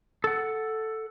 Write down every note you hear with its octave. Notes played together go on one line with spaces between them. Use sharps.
A4 F#5